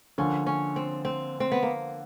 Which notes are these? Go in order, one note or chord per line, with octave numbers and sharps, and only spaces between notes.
D3 F3 A#3 C#4
C#4
C4
C4
C4
B3
A#3